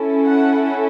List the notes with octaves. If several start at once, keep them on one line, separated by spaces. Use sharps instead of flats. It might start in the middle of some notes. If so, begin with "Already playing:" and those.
Already playing: C#4 E4 A4
F#5